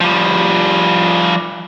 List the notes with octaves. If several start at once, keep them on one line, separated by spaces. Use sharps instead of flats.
F3 G3